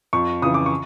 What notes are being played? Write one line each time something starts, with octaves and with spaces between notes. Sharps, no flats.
F2 C#6
C#3 E3 D#6
D6
C#6